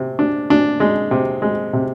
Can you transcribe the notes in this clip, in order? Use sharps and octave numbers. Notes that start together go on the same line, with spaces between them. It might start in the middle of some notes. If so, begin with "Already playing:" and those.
Already playing: C3
D4
D4
G#3
C3
G#3
C3